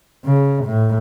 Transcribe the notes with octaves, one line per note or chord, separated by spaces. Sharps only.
C#3
A2